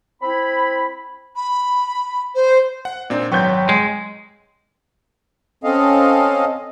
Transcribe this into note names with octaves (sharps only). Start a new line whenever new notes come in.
C4 E4 B5
B5
C5
F#5
A#2 C4 D4 D#4
G#1 F#3 B4 G5 C6 C#6 G6
G#3
C4 C#4 A4 D#5 F5